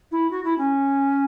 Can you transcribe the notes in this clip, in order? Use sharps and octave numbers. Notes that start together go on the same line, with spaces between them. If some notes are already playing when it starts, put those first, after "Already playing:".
E4
F#4
E4
C#4